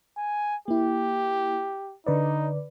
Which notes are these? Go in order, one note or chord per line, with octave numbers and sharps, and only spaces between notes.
G#5
A#3 E4 G4
D3 D#4 B4 D5